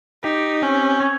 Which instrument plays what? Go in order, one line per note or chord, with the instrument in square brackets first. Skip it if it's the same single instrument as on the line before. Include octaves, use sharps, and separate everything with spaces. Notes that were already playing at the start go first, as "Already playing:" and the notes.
[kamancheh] D#4 [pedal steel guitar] G4
[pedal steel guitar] C4 [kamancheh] C#4
[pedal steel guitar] C#5